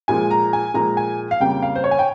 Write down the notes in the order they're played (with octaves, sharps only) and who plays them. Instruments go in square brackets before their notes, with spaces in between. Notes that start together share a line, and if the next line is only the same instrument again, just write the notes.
[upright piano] A#2 F3 G#3 G#5
A#5
G#5
A#2 F3 G#3 A#5
G#5
F5
F2 C#3 G3 A#3 G5
F5
C5
C#5
G#5
G5